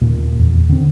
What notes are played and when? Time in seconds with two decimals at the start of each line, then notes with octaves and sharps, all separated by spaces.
0.01 D#2 A#2
0.39 E2
0.69 D3 C4